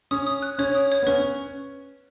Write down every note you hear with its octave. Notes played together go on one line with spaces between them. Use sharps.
C#4 D#6
D#6
F#6
C#4 C#5
D#6
C#5
B3
C#4 B4